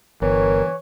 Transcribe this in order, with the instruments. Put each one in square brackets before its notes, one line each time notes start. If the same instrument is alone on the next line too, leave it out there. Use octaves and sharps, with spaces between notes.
[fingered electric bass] G1 [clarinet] E3 [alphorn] A#4 [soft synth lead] C#5